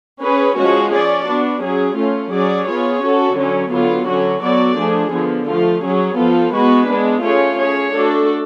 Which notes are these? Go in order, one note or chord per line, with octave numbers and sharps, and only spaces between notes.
C#4 G#4 B4
F3 G#3 C#4 F#4
C#4 G#4 D5
B3 D4 F#4
F#3 C#4 G#4
A3 C#4 F4
F#3 C#4 G#4 D5
B3 F4 G#4 C#5
C#4 F#4 A4
D3 F#3 C#4
D3 F#3 B3 F4
D3 F#3 C#4 F#4
F#3 B3 F#4 A4 D5
F3 A3 D4 G#4
D3 F3 B3
F3 A3 F4
F#3 C#4 G#4
F3 B3 F4 A4
G#3 B3 F#4 B4
G#3 B3 D4
A3 C#4 F4 G#4 C#5
C#4 G#4 C#5
A3 D4 F#4 A4